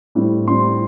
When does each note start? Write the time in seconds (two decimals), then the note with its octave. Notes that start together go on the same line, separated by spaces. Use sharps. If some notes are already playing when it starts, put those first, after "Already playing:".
0.15 A2 G3 C4 E4
0.48 A2 G3 C4 E4 C6